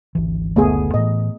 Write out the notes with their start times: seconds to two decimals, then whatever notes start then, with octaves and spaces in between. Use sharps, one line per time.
0.15 G#1 D2 E3
0.56 F#1 D2 A3 B3 G#4
0.94 A2 E3 D#5